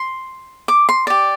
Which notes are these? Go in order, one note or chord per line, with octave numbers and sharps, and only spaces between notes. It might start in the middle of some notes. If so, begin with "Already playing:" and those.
Already playing: C6
D6
C6
G4 D5